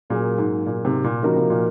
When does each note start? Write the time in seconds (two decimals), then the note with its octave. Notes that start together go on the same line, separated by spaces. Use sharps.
0.10 A#2 F#3 A#3 C#4 G#4
0.38 G#2
0.66 A#2
0.85 G#2 C3
1.04 A#2
1.23 C#3 F3 A#3 D#4 F#4 A#4
1.36 C3
1.50 A#2